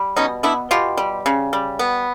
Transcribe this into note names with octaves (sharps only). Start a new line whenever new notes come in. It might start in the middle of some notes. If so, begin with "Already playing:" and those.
Already playing: G3
B2 C#4 D#4
B3 D4 E4
B2 F4 G4
G3
C#3
G3
B3